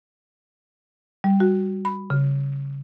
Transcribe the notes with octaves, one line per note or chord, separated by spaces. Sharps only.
G3
F#4
B5
C#3